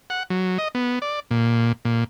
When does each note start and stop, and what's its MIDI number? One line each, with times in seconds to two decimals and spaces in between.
0.10 0.23 78
0.30 0.58 54
0.58 0.68 75
0.75 0.99 59
1.02 1.20 74
1.31 1.72 46
1.85 2.04 46